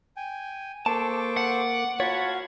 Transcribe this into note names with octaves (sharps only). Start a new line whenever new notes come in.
G5 G#5
A#3 A4 C5 A5 C#6 D6
F#5
F4 F#4 C#5 F5 A5 B5 G#6